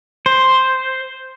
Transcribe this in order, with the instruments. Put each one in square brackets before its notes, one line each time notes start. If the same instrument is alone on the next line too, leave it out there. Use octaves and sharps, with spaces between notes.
[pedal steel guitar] C5